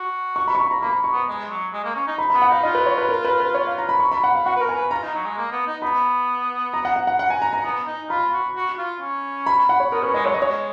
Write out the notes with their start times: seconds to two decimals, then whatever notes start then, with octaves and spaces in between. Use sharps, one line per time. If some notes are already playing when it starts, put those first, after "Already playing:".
Already playing: F#4
0.36 C#6
0.48 B5
0.55 C#6
0.60 B5
0.71 A#5
0.82 A#3 B5
1.04 C#6
1.12 B3
1.28 G#3
1.50 F#3
1.73 G#3
1.84 A#3
1.95 C#4
2.07 D#4
2.18 B5
2.30 B3 B5
2.42 F#5
2.49 D#4 F5
2.63 F4 D#5
2.75 B4
2.86 C#5
2.98 B4
3.09 A#4
3.25 B4
3.40 B4
3.54 C#5
3.67 F5
3.78 A#5
3.89 B5
4.00 C#6
4.12 B5
4.24 F#5
4.35 F5
4.46 F#4 F#5
4.56 B4
4.61 A#4
4.69 G#5
4.76 B4
4.91 F4 A#5
5.03 D#4
5.14 F#3
5.25 G#3
5.37 A#3
5.52 B3
5.67 D#4
5.82 B3 B5
6.74 A#5
6.85 F#5
6.96 F#5
7.07 F#5
7.19 F#5
7.30 G#5
7.42 A#5
7.53 A#5
7.64 B3 A#5
7.86 D#4
8.10 F4 B5
8.32 F#4
8.56 F#4
8.78 F4
9.00 C#4
9.46 B5
9.69 F#5
9.80 C#5
9.92 B3 A#4
10.03 C#4 B4
10.14 G#3 D#5
10.25 F#3 C#5
10.34 G#3 D#5
10.42 C#5